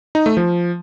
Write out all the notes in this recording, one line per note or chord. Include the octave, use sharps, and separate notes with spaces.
D#4
A3
F3